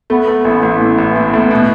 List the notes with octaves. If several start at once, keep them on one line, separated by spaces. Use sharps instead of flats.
A3 B3
A3
A1 E4
A1
A2
A1
A2
A2
B2